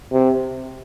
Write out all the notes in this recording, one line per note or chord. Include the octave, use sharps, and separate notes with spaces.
C3